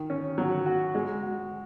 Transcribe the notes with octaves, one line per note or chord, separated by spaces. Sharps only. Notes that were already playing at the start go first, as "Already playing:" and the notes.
Already playing: D#3
C#4
F#3
F#4
G#3
F#4